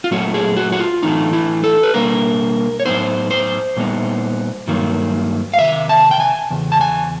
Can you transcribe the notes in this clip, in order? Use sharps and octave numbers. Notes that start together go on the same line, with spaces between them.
F4
A#2 F#3 A3 C#4 F#4
G#4
F#4
F#4
F4
A2 E3 A3 D4 D#4
E4
A4
B4
B2 G3 A#3 D4 A#4
C#5
A2 F#3 B3 D#4 C5
C5
A#2 G3 B3 D#4
G2 D#3 F#3 A#3
F5
C3 D#3 E5
A5
G5
G#5
E2 C#3
A5
G#5